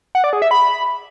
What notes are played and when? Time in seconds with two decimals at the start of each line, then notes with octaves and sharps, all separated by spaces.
0.15 F#5
0.24 D5
0.33 G#4
0.42 E5
0.51 B5